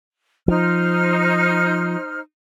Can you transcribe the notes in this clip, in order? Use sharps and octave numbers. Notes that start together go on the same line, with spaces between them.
F3 D#4 C5 F6